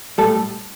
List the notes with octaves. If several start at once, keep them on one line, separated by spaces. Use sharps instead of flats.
A2 G3 A4